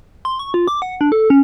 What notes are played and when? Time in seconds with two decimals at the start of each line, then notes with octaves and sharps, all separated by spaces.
0.25 C6
0.39 C#6
0.54 F4
0.68 D6
0.82 F#5
1.01 D4
1.12 A4
1.30 C#4